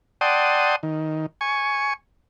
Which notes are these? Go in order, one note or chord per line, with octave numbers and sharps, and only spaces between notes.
D5 F#5 G5 A5 C6 D#6
D#3
G#5 C#6